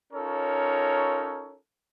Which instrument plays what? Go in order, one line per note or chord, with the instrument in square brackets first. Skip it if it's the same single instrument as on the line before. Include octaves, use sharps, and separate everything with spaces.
[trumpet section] C#4 D#4 F4 A4 A#4 C#5